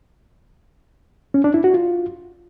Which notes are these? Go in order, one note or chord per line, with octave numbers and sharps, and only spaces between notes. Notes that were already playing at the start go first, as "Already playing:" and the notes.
C#4
D4
E4
F#4
F4